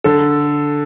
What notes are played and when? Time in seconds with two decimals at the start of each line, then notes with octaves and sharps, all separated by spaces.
0.04 D3 A4